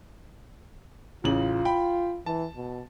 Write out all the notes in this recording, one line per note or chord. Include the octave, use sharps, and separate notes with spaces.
A1 C#3 F4 F#7
G5 B5
E3 A5
B2